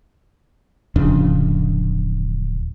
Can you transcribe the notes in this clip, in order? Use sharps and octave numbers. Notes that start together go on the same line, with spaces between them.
D1 F2 C#3 D4